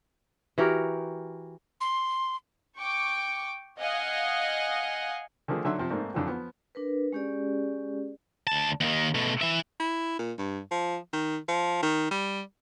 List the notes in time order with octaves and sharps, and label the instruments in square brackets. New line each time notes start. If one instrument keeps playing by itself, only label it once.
[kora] E3 F#4 G4 A#4
[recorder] C6
[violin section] G5 C#6 D6
D#5 F5 F#5 G#5
[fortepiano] D3 D#3 F3 A3 G#4
D3 F#3 E5 C6
C3 F3 C4
G#2 A3 A#3 C4 D4
F2 D3 E3 F#3
F3 B3
[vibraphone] D4 A#4 B4
G#3 C#4 G4 G#4 D5
[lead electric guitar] D2 A5
D#2 D#3
B2 A3
E3 E5
[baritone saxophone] E4
A#2
G2
F3
D#3
F3
D#3
G3